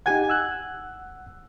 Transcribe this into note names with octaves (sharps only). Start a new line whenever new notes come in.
D#4 G4 F#5 G#5 G#6
F#5 E6 F#6